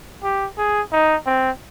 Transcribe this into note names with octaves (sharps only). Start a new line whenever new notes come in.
G4
G#4
D#4
C4